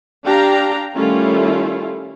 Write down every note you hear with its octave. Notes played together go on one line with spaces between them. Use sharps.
D4 G4 F5 G5 A#5
D#3 G3 A3 C#4 E4 F4